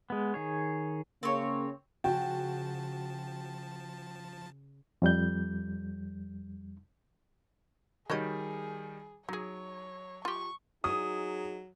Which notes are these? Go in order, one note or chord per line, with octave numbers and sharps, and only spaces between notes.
G#3 B3
D#3 G#4 C#5
C#3 A#3 C4 C#5
C#3 F3 F#4 G5 A5
F2 G3 G6
D#3 G3 F#4 G#4 C#5 D#5
F#3 D#4 G#4 C#5
F4 G4 C#6
F#3 D#4 G#4 D#6